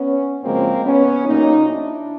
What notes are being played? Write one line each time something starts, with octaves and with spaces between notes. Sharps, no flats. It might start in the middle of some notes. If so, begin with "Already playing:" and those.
Already playing: B3 C#4
F#2 C#3 F3 G#3 A#3 C4
B3 C#4
A#2 F#3 A#3 C#4 D#4
D4 E4